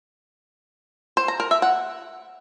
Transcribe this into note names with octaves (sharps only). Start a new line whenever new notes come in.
C5
A#5
A#4
E5
F#5